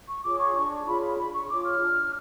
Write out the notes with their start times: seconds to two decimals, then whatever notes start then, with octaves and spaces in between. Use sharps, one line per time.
0.08 C#6
0.24 F4 G#4 C#5 D6
0.39 C#6
0.54 D4 C#6
0.86 F4 G#4 C#5 B5
1.01 B5
1.17 D4 B5
1.33 C#6
1.48 F4 G#4 C#5 D6
1.64 F6
1.80 D4